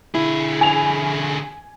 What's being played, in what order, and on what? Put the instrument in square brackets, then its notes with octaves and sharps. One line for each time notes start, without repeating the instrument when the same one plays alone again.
[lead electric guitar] D3 G#4 [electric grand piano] E4
[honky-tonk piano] G#5 F7